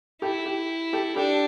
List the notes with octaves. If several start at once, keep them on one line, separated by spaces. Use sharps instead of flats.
E4 G4 A4
G4
G4 A4
D4 G4 A4